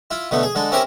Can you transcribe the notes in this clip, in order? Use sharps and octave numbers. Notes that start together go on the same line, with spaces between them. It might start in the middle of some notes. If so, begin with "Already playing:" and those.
E4 F4
B2 D3 A3 B3
G#4
D3 G#3 A4
C4 C#4 E4 G4 A#4 C5